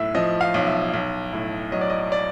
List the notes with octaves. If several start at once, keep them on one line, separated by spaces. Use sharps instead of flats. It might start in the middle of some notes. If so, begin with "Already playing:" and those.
Already playing: B1 A2 E5
F3 D#5
F5
B1
E5
B1
A2
F#3 D#5
D5
D#5
D5